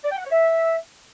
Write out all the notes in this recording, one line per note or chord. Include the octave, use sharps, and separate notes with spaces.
D5
G5
F#5
C#5
E5